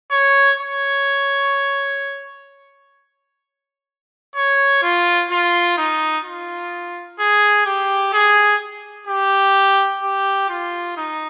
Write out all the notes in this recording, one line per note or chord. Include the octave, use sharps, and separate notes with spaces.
C#5
C#5
C#5
F4
F4
D#4
F4
G#4
G4
G#4
G4
G4
F4
D#4